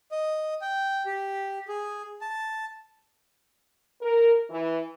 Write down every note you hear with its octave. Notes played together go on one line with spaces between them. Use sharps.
D#5
G5
G4
G#4
A5
A#4
E3